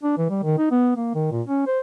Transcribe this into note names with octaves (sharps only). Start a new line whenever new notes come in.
D4
E3
G3
D#3
D#4
B3
A#3
D#3
A#2
C#4
C5